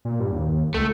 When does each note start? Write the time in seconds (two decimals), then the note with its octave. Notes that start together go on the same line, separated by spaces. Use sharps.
0.05 A#2
0.20 G2
0.32 D#2
0.74 C#2 A3